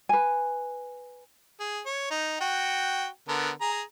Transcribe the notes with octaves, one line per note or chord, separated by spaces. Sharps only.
B4 G#5
G#4
C#5
D#4
F#4 G5
D3 B3 A#4
G#4 A#5